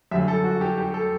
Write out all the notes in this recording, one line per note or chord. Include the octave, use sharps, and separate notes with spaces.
F#2 D3 G3 E5
A4
F#4
G4
G4
A4